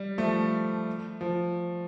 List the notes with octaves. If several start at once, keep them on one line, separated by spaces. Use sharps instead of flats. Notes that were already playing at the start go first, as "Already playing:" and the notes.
Already playing: G3
F3 A3
F3